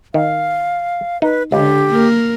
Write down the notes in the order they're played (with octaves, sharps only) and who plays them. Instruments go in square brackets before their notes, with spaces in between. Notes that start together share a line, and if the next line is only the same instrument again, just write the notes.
[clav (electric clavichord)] D#3 [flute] F5
[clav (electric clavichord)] D#4 [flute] B4
[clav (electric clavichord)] C#2 [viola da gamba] D3 [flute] G4
[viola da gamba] A#3 A#4